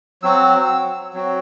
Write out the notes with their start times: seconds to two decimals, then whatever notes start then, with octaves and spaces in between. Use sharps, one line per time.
0.23 F#3 C4 F#4 E6
1.14 F#3 C4 F#4